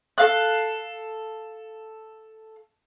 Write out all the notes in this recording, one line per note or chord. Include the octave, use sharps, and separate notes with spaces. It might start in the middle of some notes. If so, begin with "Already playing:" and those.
A4 F5 F#6